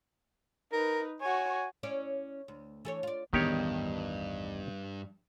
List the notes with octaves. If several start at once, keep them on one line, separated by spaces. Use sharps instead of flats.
D#4 A#4 B4
F#4 C#5 G#5
C#4 E4 D5
D2
E3 A4 C#5
F4 D5
A1 E2 G2 D#3 B3 G4 C#5 D#5